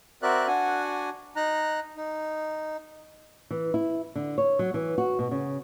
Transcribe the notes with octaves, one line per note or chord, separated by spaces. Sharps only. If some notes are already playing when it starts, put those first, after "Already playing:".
C4 F#4 A#4 D5 E5 F#6
D4 F#4 F#5 G#5
D#4 A#5 F#6
D#4
E3
E4
D3
C#5
F#3
E3
F#4
B2
C#3